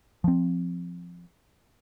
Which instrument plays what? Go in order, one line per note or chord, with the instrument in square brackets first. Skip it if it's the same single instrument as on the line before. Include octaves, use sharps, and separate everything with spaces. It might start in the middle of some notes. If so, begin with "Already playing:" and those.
[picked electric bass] F3 C4